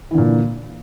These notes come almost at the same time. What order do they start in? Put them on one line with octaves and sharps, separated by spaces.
E3 D3 A#2